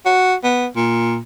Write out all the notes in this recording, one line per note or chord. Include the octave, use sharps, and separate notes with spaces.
F#4
B3
A#2